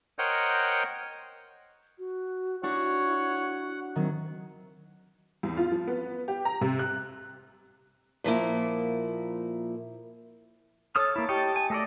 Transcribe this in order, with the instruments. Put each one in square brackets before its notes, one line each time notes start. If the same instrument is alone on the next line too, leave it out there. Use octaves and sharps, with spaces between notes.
[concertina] A#4 C5 C#5 D#5 F#5 G5
[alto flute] F#4
[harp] D4 F#4 [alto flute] E4 [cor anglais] C#5 [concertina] F#5
[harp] D#3 F#3 [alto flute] C4
[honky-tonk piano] E2
F4
F3
B3
G4
A#5
C3
F#6
[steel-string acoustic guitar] A#2 F3 A#3 E4
[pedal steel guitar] A4 D#6 F6 [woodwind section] C#5 A5
[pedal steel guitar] A#3 E4
[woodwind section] G4 A5 [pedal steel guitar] C#5 D#5 G5
[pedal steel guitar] G#5
[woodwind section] F#2 D#5 [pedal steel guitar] A3 A4 D5